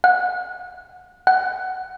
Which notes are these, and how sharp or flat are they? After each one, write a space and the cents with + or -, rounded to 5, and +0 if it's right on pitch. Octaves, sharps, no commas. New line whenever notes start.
F#5 -30
F#5 +10